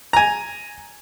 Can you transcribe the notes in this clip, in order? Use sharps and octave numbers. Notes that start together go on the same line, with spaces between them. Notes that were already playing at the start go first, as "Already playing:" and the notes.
G#5 A#5